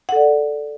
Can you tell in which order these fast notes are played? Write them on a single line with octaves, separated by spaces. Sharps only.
F#5 A4 D5